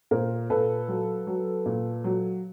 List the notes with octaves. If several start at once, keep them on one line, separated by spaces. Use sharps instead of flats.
A#2 A#4 C5
A#2 A4 B4
F#3
F#3
A#2
F#3